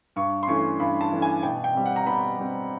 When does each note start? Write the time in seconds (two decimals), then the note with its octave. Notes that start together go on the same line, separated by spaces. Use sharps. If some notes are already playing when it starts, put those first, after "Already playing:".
0.16 G2 C#6
0.43 C6
0.48 E3 A3 C#4 C#6
0.80 G2 B5
1.01 A5
1.12 E3 A3 C#4
1.22 G#5
1.43 B2 G5
1.64 G5
1.75 G3 C4
1.86 F#5
1.96 A#5
2.07 B2 B5
2.38 G3 C4